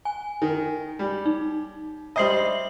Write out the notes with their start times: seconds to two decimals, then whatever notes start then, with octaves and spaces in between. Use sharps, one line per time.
0.05 G#5
0.42 D#3
0.99 G3
1.26 D#4
2.16 G3 C5 D#5 E5 C7 F#7